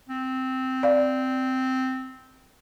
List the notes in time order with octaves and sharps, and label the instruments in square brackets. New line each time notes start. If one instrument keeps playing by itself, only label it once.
[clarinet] C4
[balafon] D5 F5